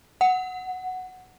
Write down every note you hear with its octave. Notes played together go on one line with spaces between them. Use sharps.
F#5